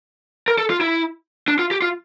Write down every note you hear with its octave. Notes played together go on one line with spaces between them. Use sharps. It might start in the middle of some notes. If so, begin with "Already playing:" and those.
A#4
A4
F4
E4
D4
F4
G4
F4